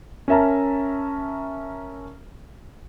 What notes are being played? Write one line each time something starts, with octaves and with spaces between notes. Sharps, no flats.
C#4 A#4 E5 A5 A#5